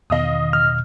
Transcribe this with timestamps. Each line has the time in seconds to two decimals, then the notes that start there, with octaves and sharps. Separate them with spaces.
0.10 E2 B2 D#3 D#5 F5 D#6
0.53 F6